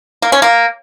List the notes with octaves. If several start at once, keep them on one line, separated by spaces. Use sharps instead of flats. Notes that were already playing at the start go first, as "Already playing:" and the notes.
A#3
C#4
A#3